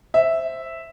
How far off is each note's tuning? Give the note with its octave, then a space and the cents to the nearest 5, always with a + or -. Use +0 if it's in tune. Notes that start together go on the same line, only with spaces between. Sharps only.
C5 +10 E5 +0